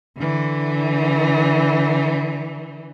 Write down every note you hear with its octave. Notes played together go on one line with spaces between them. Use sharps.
D3 E3